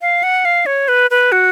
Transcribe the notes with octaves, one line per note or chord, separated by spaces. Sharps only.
F5
F#5
F5
C#5
B4
B4
F#4